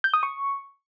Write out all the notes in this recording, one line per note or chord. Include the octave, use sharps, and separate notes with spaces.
G6
D#6
C#6